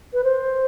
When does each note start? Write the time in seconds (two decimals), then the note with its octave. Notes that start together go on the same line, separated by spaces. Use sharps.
0.13 B4
0.24 C5